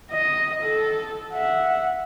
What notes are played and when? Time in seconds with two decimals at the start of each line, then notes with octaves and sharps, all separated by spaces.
0.11 D#5
0.63 A4
1.33 E5 F#5